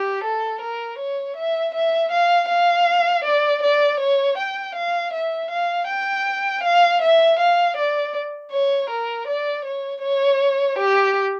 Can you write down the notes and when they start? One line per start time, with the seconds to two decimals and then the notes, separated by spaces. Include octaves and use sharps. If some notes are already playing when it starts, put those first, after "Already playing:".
Already playing: G4
0.23 A4
0.61 A#4
0.98 C#5
1.36 E5
1.74 E5
2.11 F5
2.49 F5
3.24 D5
3.62 D5
3.99 C#5
4.37 G5
4.75 F5
5.13 E5
5.50 F5
5.88 G5
6.63 F5
7.01 E5
7.39 F5
7.76 D5
8.51 C#5
8.89 A#4
9.27 D5
9.64 C#5
10.02 C#5
10.78 G4